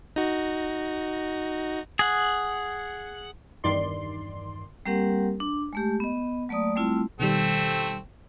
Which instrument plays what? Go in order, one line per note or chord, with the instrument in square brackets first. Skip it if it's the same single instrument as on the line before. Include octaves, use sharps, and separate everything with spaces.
[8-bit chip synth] D#4 F#4
[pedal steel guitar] G#4 F#5
[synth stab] E2 G2 D#3 D5 C6
[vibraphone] G3 A#3 C4 G4 A#4 F#5
D4
G#3 A3 G4
B3 D#5
F#3 A3 A#3 D5 D#6
G3 A3 C4 E4 F4
[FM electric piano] B2 D#3 G3 [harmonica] A3 C4